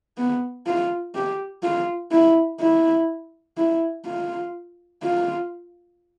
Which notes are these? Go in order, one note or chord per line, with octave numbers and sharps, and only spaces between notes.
B3
F4
G4
F4
E4
E4
E4
F4
F4